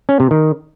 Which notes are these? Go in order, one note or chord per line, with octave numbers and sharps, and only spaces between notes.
C#4
C3
D#3